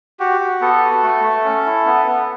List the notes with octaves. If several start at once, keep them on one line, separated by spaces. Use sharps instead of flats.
F#4 G4
F#4
B3 A4
F#4
A3
A3
C#4
E4
B3
B3